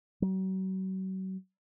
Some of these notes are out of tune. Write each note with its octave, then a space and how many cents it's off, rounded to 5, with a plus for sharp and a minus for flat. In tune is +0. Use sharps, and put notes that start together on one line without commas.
F#3 +40